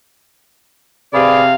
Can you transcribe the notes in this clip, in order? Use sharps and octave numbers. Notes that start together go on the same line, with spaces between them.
C3 G#4 B4 D5 F5